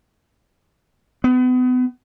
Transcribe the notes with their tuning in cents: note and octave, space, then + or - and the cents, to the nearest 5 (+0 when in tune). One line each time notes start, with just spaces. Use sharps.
B3 +35